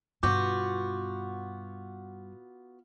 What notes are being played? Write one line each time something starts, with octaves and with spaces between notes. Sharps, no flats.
G2 B2 B3 F4 F#4 D6 G6